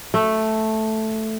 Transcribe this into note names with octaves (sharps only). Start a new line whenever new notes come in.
A3